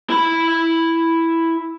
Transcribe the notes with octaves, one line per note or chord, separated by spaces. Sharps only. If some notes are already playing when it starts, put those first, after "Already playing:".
E4 B5